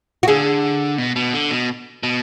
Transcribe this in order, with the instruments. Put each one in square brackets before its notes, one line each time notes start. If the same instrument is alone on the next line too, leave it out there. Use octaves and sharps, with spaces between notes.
[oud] F#4
[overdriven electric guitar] D3 [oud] G#4
[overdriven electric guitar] B2
B2
D3
B2
B2